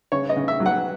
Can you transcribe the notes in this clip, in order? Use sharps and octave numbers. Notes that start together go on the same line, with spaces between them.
C#3 C#5
D#5
C#3
E5
F#3
F#5